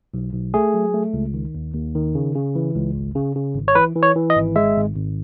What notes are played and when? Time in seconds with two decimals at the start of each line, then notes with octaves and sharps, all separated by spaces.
0.14 B1
0.33 B1
0.54 A3 G#4
0.74 F#3
0.94 A3
1.14 C#2
1.34 D#3
1.55 D#2
1.74 D#2
1.95 D#3
2.15 C#3
2.35 C#3
2.55 E3
2.76 C#2
2.95 G#1
3.16 C#3
3.35 C#3
3.55 G#1
3.68 C#5
3.75 E3 B4
3.96 E3
4.03 C#5
4.16 E3
4.30 D#5
4.36 G#1
4.56 G#3 E5
4.76 G#1
4.97 G#1